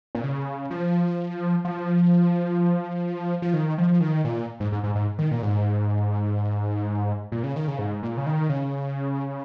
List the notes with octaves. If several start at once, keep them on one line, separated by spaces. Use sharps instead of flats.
A#2
C#3
F3
F3
F3
D#3
F3
D#3
A#2
G#2
G#2
G#2
G#2
D#3
A#2
G#2
A#2
C#3
D#3
C#3
G#2
A#2
C#3
D#3
C#3